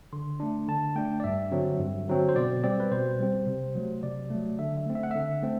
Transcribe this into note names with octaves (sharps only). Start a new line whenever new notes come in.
D3 C6
A3 D4
D3 A5
A3 D4 G5
D5
G2 E5
D3 F#3 C4
G2
D3 F#3 C4
C5
B2 D5
G3 C4 D5
B4
B2 C5
G3 C4
C3
F#3 A3
C3 D5
F#3 A3
D3 E5
E5
A3 C4
E5
F#5
D3 E5
A3 C4